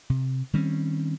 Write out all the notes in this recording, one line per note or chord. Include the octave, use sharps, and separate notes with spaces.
C3
D#3 G3 C4 C#4